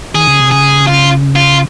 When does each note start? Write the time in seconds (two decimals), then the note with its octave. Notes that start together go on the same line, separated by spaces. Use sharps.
0.15 D#3 G#4
0.27 C#3
0.40 C3
0.51 C#3 G#4
0.87 F4
1.36 F4